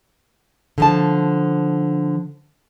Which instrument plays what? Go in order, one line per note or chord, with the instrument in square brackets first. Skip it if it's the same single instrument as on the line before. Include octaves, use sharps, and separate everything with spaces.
[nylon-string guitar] D3 F3 A5